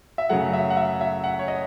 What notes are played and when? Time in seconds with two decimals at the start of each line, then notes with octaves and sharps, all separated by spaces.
0.18 E5
0.29 F#2 C#3 F#3 A3 F#5
0.53 E5
0.70 F#5
0.77 E5
1.01 E5
1.24 F#5
1.39 C#5
1.48 D#5